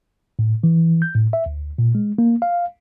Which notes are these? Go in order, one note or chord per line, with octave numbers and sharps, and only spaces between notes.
A2
E3
G6
A2
E5
D2
A#2
G#3
A#3
F5